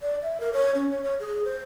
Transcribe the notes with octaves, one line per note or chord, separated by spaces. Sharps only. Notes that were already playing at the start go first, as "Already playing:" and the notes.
D5
E5
A#4
C#5
C#4
C#5
C#5
G#4
C5